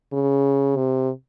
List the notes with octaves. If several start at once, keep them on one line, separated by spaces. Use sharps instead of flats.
C#3
C3